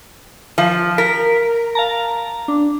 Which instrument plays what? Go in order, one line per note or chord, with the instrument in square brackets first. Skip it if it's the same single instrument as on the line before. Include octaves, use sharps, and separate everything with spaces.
[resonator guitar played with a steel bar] F3
[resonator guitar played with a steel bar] A#4 [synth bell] B6
[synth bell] F5 A5 A#5
D4